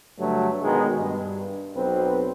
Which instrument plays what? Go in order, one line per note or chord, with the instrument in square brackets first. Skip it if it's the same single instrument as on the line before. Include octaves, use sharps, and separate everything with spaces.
[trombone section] G2 D3 F#3 A3
B2 D#3 G#3 B3
G2
B1 C4 B4